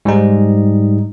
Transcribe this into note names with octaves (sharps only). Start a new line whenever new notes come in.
G#2 G3 D#4